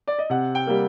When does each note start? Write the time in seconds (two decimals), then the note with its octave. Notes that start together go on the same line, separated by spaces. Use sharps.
0.08 D5
0.19 D#5
0.30 C3 F#5
0.55 G5
0.67 G3 A#3